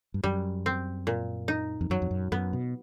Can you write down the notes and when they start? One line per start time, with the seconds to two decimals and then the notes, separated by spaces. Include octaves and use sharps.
0.14 G2
0.24 F#2 G3
0.66 C4
1.07 A#2
1.48 D#4
1.81 F2
1.90 F#2 F#3
2.02 F2
2.11 F#2
2.32 F#2 B3
2.53 B2